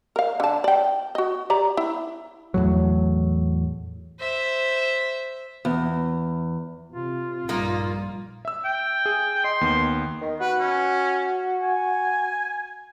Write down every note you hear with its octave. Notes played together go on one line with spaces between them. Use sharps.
A#4 F5
D3 A5
D5 G5
F#4 D#5
G4 D5 A#5
E4
E2 A2 F#3
C5 E5
E2
C3 F4
A#1 G2 G3 A#3 D#4
E5 E6
G5
G#4
D#5 C6
D#2 B3
D#3
F#4 B4
C#4
G#5